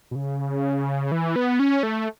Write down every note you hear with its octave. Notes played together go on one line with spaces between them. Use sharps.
B2
C#3
E3
B3
C#4
A3